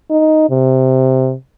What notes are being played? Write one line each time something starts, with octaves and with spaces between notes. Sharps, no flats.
D#4
C3